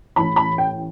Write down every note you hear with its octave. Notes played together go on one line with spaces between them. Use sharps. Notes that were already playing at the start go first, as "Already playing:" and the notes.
A1 A2 E3 B5
B5
G5